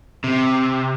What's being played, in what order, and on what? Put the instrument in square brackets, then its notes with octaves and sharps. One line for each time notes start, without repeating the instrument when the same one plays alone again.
[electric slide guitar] C3